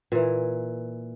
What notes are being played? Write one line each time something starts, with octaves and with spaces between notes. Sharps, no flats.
A#2 E3